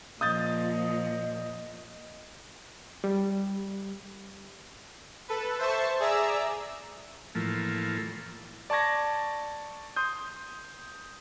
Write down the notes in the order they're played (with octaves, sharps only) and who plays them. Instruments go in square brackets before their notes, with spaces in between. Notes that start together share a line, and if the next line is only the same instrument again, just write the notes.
[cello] A#2 F3 [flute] D#5 [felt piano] D#6 G6 A6
[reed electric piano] G3
[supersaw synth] A4 B4
C5 E5 A5 C#6
G#4 D5 E5 A#5 E6
[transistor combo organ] A2 E3 F3 A3 A#3
[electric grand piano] D5 A5 C#6 G#6 A#6
C6 D#6 G6